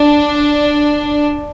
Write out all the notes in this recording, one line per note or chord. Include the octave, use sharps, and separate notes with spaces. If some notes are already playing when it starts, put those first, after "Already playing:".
Already playing: D4